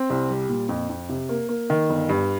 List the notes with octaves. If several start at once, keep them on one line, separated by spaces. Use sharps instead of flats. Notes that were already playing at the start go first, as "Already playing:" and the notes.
Already playing: C4
C2
G3
A#2
F2
F2
C3
A#3
A#3
D#3
G1
G2